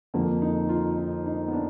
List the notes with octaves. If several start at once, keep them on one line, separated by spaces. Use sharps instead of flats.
F2 D3 F3 A#3
D#4
F4
D#4
D#4
B3
D4